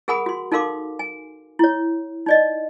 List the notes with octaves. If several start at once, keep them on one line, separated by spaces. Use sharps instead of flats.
G#4 A#4 F#5 G#5 B5 D#6
F#4 C6
D#4 A4 A#4 F5 C6 D6
G#5
E4 C#5
D#4 D5 D#5